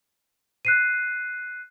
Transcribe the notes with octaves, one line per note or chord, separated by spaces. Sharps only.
F#6 C7 D#7